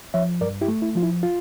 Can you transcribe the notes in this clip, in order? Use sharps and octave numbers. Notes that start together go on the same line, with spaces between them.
F3 C#5 E5
G2 A#4 D5
E4 G4
A3
E4
F3 F4
E4
F4